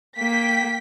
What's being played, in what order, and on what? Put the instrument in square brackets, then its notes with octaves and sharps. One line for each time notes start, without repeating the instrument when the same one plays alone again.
[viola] A#3 [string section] G5 B6